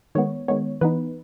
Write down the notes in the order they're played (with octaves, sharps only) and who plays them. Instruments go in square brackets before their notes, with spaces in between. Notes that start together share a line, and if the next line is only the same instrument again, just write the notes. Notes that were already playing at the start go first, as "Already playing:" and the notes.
[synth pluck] D#3 G#3 B3 C#5
D#3 G#3 B3 C#5
E3 B3 D#4 B4